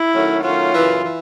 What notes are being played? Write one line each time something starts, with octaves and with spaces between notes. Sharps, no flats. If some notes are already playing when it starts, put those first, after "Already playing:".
Already playing: E4
D#3 F#3 A3 C#4 F#4
D#3 F#3 A3 C#4 F4 F#4
F#2 C#3 E3
E3